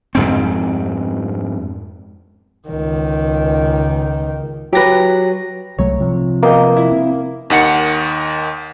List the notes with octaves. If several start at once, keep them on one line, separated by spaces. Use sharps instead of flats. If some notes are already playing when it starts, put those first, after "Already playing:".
F2 G#2 C4
C#2 D#3
F#3 G4 B4 A#6
C2 F#3 A3 C#5
C3 F3
A#3 B3 D#5 G5
E4
C4
D#2 D#3 F#5 C#7